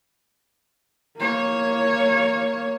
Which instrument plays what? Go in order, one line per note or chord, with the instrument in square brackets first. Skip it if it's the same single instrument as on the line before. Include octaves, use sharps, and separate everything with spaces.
[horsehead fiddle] A#3 C#5